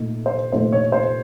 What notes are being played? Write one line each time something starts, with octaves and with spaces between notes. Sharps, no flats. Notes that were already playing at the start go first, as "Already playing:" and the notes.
Already playing: A#2 A3 D#4
C5
A#2 A3 D#4 C5
C#5
C5